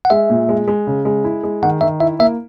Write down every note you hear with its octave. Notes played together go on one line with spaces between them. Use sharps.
F#5
G#3 E5
A#2
G#3
G#3
C#3
G#3
E4
G#3
D#3 F#5
D#3 E5
E4 E5
A#3 E5